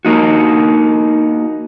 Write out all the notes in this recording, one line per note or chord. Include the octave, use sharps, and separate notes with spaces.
A#3 D#4 F#4